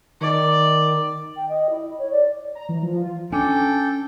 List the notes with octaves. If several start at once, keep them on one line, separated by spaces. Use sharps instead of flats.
D#3 D5
G5
D#5
E4
C#5
D5
A#5
E3
F3
F4
C#4 D4 A4 G5 G#5 D6